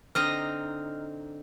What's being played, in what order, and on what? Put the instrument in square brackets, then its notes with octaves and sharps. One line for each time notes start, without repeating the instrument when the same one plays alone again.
[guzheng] D3 D#4 [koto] C4 D#5 A#5 [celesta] F6